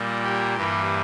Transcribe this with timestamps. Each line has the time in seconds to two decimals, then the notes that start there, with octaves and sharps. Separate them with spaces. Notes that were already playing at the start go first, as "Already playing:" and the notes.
Already playing: A#2 G3 A#3
0.24 G4
0.56 G2 E3 G3 A#3